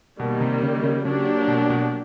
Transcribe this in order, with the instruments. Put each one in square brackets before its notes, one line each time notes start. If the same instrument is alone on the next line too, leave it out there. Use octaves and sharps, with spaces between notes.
[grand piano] B2 [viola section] D#3 G3 A#3
[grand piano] C3
C#3
C#3
[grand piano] C#3 [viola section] F#3 A#3 D4 G4
[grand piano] B2
B2